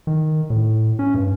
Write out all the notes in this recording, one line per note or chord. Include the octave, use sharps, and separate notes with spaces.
D#3
A2
C#4
G2